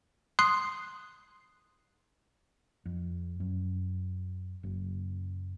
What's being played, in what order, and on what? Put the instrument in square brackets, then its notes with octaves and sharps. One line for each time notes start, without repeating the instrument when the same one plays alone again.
[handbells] C6 D#6 F#6 C7
[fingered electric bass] F2
F#2
F#1